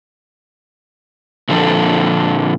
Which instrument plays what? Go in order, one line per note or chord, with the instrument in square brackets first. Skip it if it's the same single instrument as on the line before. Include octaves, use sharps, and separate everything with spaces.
[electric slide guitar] A#2 D3 F3 A4